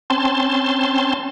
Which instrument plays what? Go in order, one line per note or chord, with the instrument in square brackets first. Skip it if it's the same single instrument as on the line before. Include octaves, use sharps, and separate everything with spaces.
[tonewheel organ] C4 C#4 A5 C6